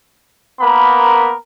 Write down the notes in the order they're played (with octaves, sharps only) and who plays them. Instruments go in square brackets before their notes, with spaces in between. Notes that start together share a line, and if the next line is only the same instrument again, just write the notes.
[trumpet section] A#3 B3 A#4 B5